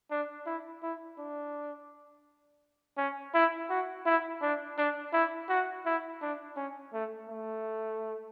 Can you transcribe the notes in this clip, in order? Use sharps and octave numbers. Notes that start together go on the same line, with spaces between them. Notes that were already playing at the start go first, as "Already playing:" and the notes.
D4
E4
E4
D4
C#4
E4
F#4
E4
D4
D4
E4
F#4
E4
D4
C#4
A3
A3